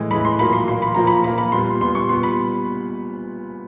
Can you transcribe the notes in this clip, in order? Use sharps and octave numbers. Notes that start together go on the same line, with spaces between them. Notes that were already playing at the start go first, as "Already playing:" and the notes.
Already playing: A2 E3 G#3
A2 E3 G#3 B5
C6
A#2 F#3 A#3 B5
C6
A#2 F#3 A#3 C6
B5
A#2 F3 A#3 A#5
B5
A#2 F3 A#3 B5
B5
A#2 G3 B3 C6
A#2 G3 B3 C6
C#6
A#2 G3 B3 C6
B5